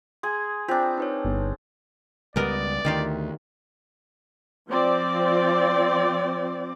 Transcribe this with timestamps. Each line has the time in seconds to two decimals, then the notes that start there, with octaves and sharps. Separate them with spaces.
0.23 G#4 C6 G#6
0.68 C4 D4 F4
0.98 D#4 B4 C#5
1.25 G1
2.36 C#2 G3 B3 A#4 D5 D#5
2.85 D2 D#3 F4 G4
4.69 F3 C4 D5